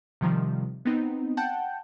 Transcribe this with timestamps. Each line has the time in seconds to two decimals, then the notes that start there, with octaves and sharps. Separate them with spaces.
0.21 C3 D#3 F3 G3
0.85 B3 C4 D#4
1.37 F#5 G5 A5 G6